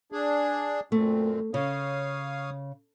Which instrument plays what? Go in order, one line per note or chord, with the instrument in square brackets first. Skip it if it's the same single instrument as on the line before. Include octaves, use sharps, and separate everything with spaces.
[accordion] D4 G#4
[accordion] F#2 A#2 C4 [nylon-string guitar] A3
[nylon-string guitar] C#3 [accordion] C#5 F5 D#6